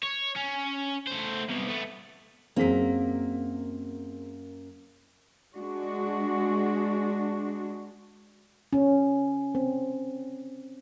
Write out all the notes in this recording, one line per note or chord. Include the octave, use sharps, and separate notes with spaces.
C#5
C#4
A3 C5
C2 B2
A3 B3
F#2 A#3 C4 G#4 B6
G#3 D4 F#4
C#4
C4